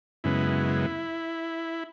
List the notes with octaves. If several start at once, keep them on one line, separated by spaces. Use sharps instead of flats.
F#2 C#3 G#3 B3 E4